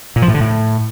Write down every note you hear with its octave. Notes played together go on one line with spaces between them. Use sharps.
A#2
F3
A2
D3
A2